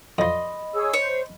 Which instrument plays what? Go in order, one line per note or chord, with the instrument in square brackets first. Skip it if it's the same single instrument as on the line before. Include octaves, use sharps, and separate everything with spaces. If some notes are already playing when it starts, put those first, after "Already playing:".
[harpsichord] F2 F3 [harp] D#5 B5 C6
[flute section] G#4 C#5 E6
[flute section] C5 [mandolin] C#5